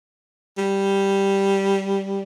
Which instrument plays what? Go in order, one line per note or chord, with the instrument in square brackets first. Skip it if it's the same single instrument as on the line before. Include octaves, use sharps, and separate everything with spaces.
[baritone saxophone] G3